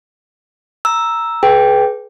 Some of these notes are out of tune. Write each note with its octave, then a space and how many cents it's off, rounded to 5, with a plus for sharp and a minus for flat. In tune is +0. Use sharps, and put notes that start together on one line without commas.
A#5 +0 E6 +0
G#4 +30 B4 +0 G5 +0